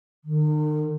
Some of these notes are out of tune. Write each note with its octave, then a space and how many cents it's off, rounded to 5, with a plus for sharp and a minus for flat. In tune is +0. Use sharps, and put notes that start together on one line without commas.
D#3 -40